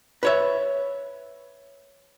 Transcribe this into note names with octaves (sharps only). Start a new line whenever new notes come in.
B4 C#5 E5